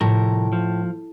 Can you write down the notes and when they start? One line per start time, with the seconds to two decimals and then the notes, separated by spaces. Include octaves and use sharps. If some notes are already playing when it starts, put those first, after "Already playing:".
0.01 C2 A2 F3 A#4
0.53 F3